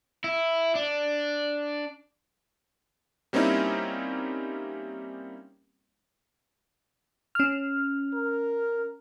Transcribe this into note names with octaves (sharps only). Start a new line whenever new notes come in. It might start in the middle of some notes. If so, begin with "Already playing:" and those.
E4
D4
G3 A#3 C4 C#4 D#4 E4
C#4 F6
A#4